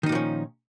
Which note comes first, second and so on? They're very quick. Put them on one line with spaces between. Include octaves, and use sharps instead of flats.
D#3 D#4 A#2 F3 C#4